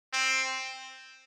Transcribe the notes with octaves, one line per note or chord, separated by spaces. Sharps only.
C4